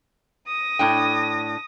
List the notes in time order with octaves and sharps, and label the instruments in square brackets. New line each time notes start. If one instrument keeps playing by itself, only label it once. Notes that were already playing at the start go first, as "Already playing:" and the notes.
[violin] D#6 A#6
[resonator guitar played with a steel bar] A2 D4 G5